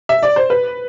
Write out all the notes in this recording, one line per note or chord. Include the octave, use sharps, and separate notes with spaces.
E5
D5
C5
B4